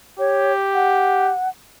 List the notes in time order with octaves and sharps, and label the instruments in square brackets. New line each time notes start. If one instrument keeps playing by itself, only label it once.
[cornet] G4 [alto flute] C#5
[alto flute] F#5